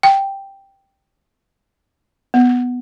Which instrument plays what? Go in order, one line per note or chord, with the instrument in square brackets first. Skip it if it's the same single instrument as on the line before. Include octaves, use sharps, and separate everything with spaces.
[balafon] G5
B3